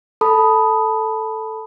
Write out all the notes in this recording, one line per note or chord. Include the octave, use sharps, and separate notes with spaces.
A4 A5 B5 D#6